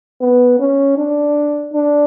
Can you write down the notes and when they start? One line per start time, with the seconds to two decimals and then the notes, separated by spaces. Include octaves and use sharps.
0.21 B3
0.60 C#4
0.97 D4
1.74 D4